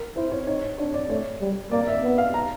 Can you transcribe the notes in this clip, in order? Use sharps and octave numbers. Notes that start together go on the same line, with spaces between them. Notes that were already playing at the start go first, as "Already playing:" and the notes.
Already playing: A#4
E4 C5
C#5
D#4 C#5
D4 C#5
D5
A3 C#5
G3
A#3 D5
E5
B3
F5
A#5